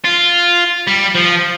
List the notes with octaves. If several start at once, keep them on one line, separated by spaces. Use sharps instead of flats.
F4
G3
F3